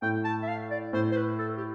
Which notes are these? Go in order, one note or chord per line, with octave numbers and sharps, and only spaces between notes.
A2 G5
A5
E5
F5
D5
A2 C5
C5
B4
A4
G4